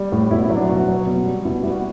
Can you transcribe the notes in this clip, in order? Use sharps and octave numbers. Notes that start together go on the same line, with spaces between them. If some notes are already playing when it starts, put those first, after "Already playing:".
Already playing: G3
A2
B2 E4
E4
F#3
D4
B2 F#4
F#3
B2
G3
B2 E4
G3 E4
F#4